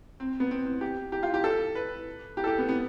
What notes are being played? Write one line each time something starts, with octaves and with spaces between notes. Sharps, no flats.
C4
B3
C4
C4
G4
G4
F4
G4
A4
B4
G4
A4
G4
B3
B3